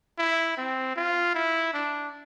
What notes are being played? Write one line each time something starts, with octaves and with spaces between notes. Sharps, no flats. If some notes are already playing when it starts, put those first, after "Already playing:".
E4
C4
F4
E4
D4